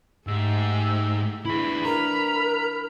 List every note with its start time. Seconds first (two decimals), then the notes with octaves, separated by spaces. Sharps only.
0.27 G#2 A3 G4 E6
1.45 E3 D4 E4 G#4 B5
1.85 A#4 A#5